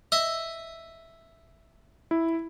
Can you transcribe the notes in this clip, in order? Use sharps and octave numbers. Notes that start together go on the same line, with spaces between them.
D#5 E5 D#6
E4